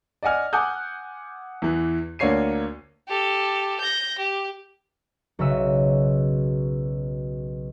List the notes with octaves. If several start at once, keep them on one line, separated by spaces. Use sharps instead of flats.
D5 D#5 F#5 G#5 F6
F#5 G#5 D6 D#6 F#6 G6
E2 E3
D2 A#3 D4 C#5 C7 D#7
G4 A4
G6 A#6
G4
B1 C#3 F#4 E5 E6 D#7